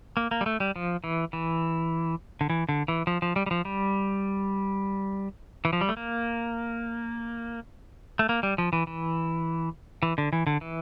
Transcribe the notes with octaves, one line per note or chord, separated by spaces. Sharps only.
A#3
A#3
G3
A3
G3
F3
E3
E3
D3
E3
D3
E3
F3
F3
G3
G3
F3
G3
E3
F3
G3
A3
A#3
A3
A#3
G3
F3
E3
E3
E3
D3
E3
D3
E3